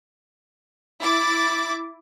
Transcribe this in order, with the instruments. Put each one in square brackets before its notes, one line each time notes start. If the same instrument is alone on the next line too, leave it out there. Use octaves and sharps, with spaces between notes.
[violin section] E4 D6 A6